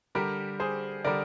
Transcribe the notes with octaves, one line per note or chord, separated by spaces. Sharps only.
D3 G3 G4 A#4
G#4 C5
D3 G3 A#4 D5